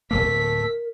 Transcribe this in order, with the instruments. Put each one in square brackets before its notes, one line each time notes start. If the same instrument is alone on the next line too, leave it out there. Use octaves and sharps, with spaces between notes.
[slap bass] D1 E2 A#3 [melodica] A3 A4 [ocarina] A#4 [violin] B6